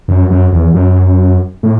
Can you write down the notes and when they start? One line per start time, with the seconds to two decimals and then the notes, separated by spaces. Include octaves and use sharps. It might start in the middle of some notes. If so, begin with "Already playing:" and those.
0.08 F#2
0.31 F#2
0.52 E2
0.74 F#2
1.63 A2